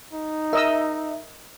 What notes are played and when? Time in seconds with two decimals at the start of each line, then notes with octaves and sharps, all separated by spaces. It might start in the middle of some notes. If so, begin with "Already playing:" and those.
0.13 D#4
0.53 A#4 D#5 E5 E6